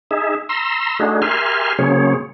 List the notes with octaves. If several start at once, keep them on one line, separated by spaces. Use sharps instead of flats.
D#4 G#4 E5
A#5 C6 E6
A3 D4 D#4 F#4 G#4
G4 A#4 E5 G#5 C6 F6
C#3 F#3 A#3 C4 G#4 C#5